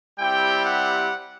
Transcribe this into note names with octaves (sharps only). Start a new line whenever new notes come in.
G3 C4 E4 G4 G5
F#5